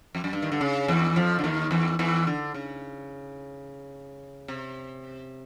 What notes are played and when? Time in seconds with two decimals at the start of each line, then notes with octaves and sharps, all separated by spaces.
0.15 F2
0.24 F#2
0.33 G2
0.42 D#3
0.52 D3
0.61 C#3
0.88 E2 E3
1.16 F2 F3
1.39 D3
1.44 D#2 D#3
1.71 E2 E3
1.99 E2 E3
2.27 D3
2.54 C#3
4.48 C3